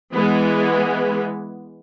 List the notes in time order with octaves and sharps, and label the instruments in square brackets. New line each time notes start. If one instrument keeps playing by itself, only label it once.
[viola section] E3 G#3 B3